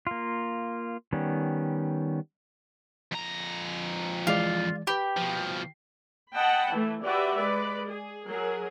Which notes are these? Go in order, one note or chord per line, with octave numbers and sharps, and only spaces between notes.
A#3 F4
D#3 G3 B3 C#4
F2 A#5
E3 G#3 F4 D5
G4 B4 B5 D6
B2 F3
D#5 F#5 G5 A5 B5
E3 A3
F#4 G4 B4 D5 E5
G#3 B4 D5
G#4
F#3 G#4 A#4